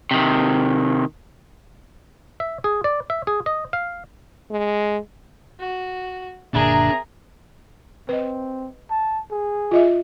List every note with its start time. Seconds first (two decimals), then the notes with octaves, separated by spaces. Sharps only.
0.11 C3 D#3
2.40 E5
2.64 G#4
2.84 D5
3.10 E5
3.27 G#4
3.46 D#5
3.73 F5
4.51 G#3
5.60 F#4
6.54 F#1 A#2 D3 D4 G#4 A#4 E5 A#5
8.09 C4 B4 D#5
8.90 A5
9.32 G#4
9.71 F4 D#5 E5